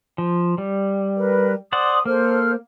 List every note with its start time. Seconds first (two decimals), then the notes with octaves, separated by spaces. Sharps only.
0.18 F3
0.58 G3
1.17 A#4 B4
1.73 C5 D5 F#5 D#6
2.06 A#3 A4 C5 F6